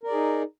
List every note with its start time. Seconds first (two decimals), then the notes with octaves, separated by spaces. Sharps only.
0.03 A#4
0.07 D5
0.10 G#4
0.14 D#4